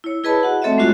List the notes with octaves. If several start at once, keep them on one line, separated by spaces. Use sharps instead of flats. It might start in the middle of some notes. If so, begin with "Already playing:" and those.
E4 C#5
E4 G#4 B4 D#5 A5 B5
F#4 F#5
A3 C4 A4 C#5 D#5 E5
G#3 C#4 D4 F4 F#4 D#5